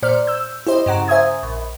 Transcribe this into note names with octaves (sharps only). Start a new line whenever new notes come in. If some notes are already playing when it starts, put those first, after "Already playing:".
A#2 C5 D5 F6
E6 G6
E4 G4 C5 D#5
G2 C#3 F#5 A#5
C5 E5 G#5 D#6 G#6
A#1